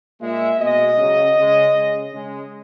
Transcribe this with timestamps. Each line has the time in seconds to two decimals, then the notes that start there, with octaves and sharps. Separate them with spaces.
0.21 A#2 G#3 E5
0.59 B2 G#3 D#5
0.97 C#3 F#3
1.37 C#3 G#3
1.75 C#3 G#3
2.13 C#3 G#3